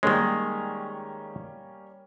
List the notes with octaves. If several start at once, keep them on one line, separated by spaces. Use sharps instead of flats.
D#3 G3 G#3 A#3 C#4